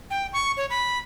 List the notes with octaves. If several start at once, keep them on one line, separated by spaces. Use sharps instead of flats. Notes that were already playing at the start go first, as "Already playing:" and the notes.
G5
C#6
C#5
B5